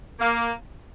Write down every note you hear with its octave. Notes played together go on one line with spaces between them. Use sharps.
A#3